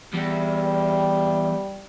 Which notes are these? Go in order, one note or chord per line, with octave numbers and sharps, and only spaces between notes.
E2 G3